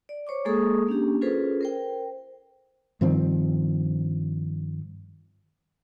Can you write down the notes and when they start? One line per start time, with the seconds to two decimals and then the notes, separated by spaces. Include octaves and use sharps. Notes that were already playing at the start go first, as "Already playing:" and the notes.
0.09 D5
0.27 C5 C#5 C#6 D6
0.45 G#3 A#3 G#4 A4 C#6 D#6
0.87 A#3 C#4 D4 G4
1.21 C#4 F4 G#4 A4 B4 C5
1.61 A#4 C5 G5
3.01 G2 D#3 F3 C4